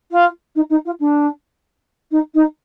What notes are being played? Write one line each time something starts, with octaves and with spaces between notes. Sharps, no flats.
F4
D#4
D#4
F4
D4
D#4
D#4